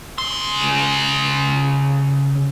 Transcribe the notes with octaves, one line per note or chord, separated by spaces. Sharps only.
C#3 C6